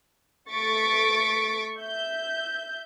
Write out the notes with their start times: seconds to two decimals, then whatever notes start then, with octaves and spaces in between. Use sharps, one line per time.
0.49 A3 C#6 A6 B6 D7
1.77 E5 G6